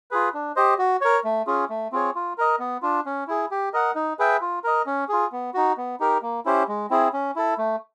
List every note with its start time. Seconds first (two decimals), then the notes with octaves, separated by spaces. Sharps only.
0.11 F4 G#4 B4
0.34 D4
0.56 G4 C5 D#5
0.79 F#4
1.01 A#4 C#5
1.24 A3
1.47 C#4 F4 G#4
1.70 A3
1.92 C4 F4 G#4 C#5
2.15 F4
2.38 A#4 D#5
2.59 B3
2.82 D4 F4
3.06 C#4
3.27 E4 G#4
3.51 G4
3.73 A#4 D#5 F#5
3.95 D#4
4.19 G#4 B4 E5 G5
4.41 F4
4.64 A#4 D#5
4.86 C#4
5.09 F4 G#4
5.32 B3
5.54 D#4 F#4
5.77 B3
6.00 D#4 G4 A#4
6.22 A#3
6.45 C#4 E4 G4 C5
6.68 G#3
6.90 C4 E4 G#4
7.13 C#4
7.36 E4 A4
7.58 A3